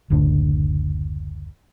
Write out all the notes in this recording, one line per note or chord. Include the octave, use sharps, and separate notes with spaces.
F#1 D2 A2 D3